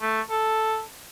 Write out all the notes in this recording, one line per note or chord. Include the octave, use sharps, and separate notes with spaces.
A3
A4